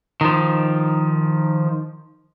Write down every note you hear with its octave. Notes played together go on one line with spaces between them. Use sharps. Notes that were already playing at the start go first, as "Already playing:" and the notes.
D#3 F3